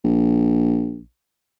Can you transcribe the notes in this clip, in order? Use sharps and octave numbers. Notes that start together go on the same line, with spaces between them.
A#1